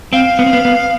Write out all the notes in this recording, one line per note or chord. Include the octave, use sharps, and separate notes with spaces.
C4 F5
B3
C4
B3
B3